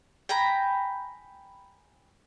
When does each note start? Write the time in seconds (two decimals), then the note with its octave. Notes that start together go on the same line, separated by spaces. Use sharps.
0.29 G5 G#5 A#5 B5